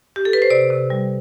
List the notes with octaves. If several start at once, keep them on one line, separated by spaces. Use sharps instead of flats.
G4
A4
B4
C5
C3 D5
C3
G3